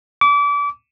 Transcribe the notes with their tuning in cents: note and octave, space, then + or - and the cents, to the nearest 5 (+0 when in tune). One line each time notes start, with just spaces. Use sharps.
D6 -30